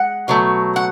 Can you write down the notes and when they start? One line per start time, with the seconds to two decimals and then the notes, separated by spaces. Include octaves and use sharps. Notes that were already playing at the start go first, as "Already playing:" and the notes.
Already playing: G#3 F#5
0.28 B2 F#3 A3
0.76 F#5